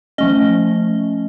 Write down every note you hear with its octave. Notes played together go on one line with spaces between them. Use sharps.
F3 A3 C#4 D#5